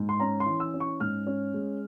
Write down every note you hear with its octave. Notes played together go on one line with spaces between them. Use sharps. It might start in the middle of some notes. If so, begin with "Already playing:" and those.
Already playing: G#2
C6
C#4 A#5
C6
E3
E6
C#4
C#6
G#2 F6
C#4
G#3